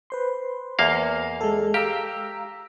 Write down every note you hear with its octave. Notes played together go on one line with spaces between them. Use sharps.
B4 C5 C6
E2 A#3 F5
G#3 A4
G4 F5 A#5 E6